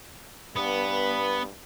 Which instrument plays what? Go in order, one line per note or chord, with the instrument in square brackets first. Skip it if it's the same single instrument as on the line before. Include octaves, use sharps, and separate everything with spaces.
[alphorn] G2 [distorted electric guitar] B3